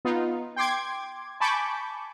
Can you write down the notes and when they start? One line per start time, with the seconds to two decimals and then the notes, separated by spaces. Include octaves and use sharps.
0.05 B3 D#4 F4
0.56 G5 C6 D6 G#6
1.40 G#5 A5 B5 C#6 D6 G6